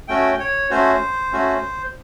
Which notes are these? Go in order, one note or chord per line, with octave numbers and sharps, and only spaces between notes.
A3 C#4 F#4 G5
C#5
A3 C#4 F#4 C5
A3 C#4 F#4